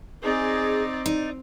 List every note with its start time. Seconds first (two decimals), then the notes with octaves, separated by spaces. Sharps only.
0.23 C4 D#4 G#4 D5
1.06 D#4 D5